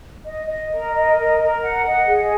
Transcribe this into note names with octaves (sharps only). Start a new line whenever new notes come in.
D#5
D#5
A#4
D#5
A#4
A#4
F#5
D#5
G#4